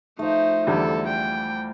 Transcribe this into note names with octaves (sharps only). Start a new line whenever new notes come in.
F3 A3 D#4 C5
E2 D3 G3 A4
G5